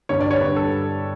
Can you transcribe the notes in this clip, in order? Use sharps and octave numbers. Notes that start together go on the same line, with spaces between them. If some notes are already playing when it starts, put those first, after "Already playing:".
G2 D3 G3 C#5
D5
C#5
G2 D3 G3 B4
A4